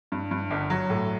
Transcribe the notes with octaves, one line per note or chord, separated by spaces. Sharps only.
G2
G2
G1
F#3
A2